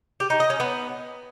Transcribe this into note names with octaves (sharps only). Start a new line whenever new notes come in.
G4
D#4
D#5
C#4
B3